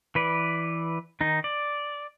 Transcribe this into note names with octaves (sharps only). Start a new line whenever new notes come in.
E3 B4 D5
D#3 D#4
D5